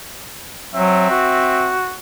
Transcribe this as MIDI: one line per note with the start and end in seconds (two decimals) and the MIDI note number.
0.74 1.07 54
0.74 1.75 60
0.74 1.75 76
1.10 1.94 66